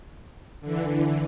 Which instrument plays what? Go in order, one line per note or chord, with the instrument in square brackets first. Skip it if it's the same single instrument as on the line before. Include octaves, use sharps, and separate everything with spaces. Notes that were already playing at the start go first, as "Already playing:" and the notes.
[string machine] D3 E3